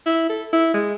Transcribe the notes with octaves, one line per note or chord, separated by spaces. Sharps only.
E4
A4
E4
G#3